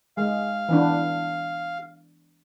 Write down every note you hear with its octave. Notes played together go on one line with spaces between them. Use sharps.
G#3 F5
E3 B3 D4